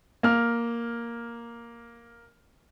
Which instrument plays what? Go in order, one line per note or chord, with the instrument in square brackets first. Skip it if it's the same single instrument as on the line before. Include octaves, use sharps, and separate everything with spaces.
[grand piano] A#3 F6